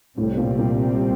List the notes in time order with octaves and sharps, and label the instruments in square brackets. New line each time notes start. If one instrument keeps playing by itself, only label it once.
[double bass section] C2 C3 G3 C4 [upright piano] A2
[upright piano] A#2
A#2